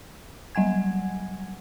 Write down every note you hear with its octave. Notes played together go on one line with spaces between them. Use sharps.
F#3 G3 F#5 G#5 G#6